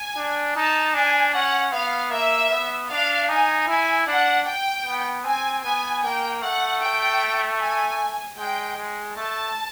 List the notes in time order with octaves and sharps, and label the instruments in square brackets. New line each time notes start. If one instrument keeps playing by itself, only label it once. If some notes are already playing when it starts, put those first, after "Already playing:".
Already playing: [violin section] G#5
[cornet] D4
[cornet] D#4 [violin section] A5
[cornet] D4 [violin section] G#5
[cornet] C#4 [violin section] F#5
[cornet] B3 [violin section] F5
[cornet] A#3 [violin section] E5
[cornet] B3
[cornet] D4 [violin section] F5
[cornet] D#4 [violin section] G#5
[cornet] E4 [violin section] G#5
[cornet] D4 [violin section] F#5
[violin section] G5
[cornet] B3
[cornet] C4 [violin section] G#5
[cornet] B3 [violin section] G#5
[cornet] A#3 [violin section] G5
[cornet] A3 [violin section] F#5
[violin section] G5
G#5
[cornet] G#3 [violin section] G5
[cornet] G#3
[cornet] A3 [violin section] A5